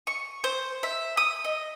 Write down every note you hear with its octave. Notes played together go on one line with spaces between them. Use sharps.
C#6
C5
E5
D#6
D#5